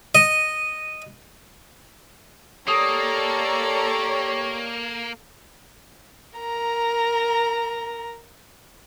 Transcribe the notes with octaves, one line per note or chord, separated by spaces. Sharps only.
D#5
A#3 G4 A4 C#5 D5 A#5 D#6
A#4 A#5